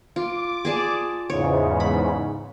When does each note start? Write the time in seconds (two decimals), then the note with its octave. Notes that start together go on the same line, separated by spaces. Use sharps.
0.16 F4 D6
0.65 G#4 D5 A5
1.30 E2 G#2 C#3 C#5
1.80 B5